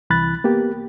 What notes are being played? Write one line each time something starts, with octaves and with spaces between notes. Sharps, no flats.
C2 E3 B5 F#6 A6
A#3 B3 G4